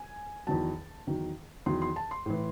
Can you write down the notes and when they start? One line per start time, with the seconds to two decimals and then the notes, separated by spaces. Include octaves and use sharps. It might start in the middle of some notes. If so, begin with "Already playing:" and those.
Already playing: G#5
0.47 E2 D#3 F#3 A5
1.07 E2 D#3 F#3
1.66 E2 D#3 F#3 C6
1.82 C6
1.96 A5
2.11 C6
2.26 A2 E3